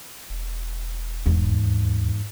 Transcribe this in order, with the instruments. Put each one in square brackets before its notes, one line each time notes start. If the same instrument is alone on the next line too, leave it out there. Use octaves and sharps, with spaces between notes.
[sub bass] E1
[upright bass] E2 G#2
[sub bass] D#2